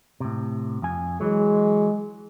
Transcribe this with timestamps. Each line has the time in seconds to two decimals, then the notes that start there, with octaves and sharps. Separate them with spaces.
0.20 A2 C3
0.82 F2 G#5
1.21 E3 F#3 G#3